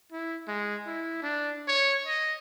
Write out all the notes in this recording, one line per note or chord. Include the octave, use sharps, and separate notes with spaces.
E4
G#3
E4
D4
C#5
D#5